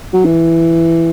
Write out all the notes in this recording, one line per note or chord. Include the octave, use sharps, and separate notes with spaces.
F#3
E3